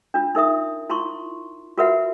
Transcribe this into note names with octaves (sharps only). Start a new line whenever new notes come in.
D4 F4
D#4 A#4 E5 D#6
E4 F4 A#5 C6 C#6
F4 F#4 A#4 B4 E5 F#5